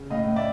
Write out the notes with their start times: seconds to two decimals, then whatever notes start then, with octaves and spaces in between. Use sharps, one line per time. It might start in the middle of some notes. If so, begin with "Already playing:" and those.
Already playing: C#3
0.10 A2 D#5 F5
0.27 A2
0.36 D5 E5